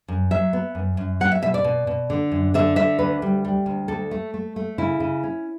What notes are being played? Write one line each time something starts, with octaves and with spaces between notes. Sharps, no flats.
F#2
F#3 E5
B3
F#2
F#2
F#3 F#5
E5
B2 E5
D5
B2
B2
D3
F#2
D3 E5
D3 E5
D2 B4
G3
G3
D2
D2 A4
A3
A3
A3
C#3 E4
C#3
C#4